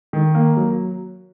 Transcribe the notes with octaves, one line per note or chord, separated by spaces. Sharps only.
D#3
A#3
F#3